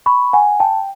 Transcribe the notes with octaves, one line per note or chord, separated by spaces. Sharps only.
B5 C#6
F#5 G#5
G5 A5